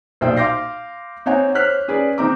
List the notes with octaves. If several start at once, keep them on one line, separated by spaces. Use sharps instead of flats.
B1 A#2 C5 D5 D#5 G5
F5 C6 D6 G6 A#6 C7
C4 D#4 C#5 F#5 G#5
C5 C#5 F6 F#6 B6
C#4 G#4 B4 D5
D#3 C4 D#4 A#5 D6